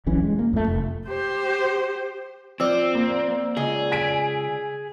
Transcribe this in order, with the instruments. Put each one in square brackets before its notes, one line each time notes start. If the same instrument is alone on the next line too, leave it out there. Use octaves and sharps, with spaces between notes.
[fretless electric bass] E1 B1 E3 C#4
G#3
A#3
F2 A3
F1
[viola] G4 C5
[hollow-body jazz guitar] F3 [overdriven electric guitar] C4 [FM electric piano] D5 E6
[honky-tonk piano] A#3
[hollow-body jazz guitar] C#2 D#5 [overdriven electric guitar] G#4
[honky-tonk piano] G#5 B6 D7